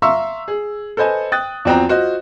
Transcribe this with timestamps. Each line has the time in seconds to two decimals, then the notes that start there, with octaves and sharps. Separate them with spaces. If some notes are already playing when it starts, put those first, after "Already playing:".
0.02 E5 F5 A#5 C6 C#6 E6
0.48 G#4
0.97 A4 B4 C5 D#5 G#5
1.32 G5 D#6 F#6 A6
1.65 E2 F3 C4 F#4 G5 A#5
1.89 F4 F#4 C5 D#5